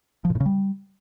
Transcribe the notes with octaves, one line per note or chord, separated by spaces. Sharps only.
F3
A#2
A2
C#3
G3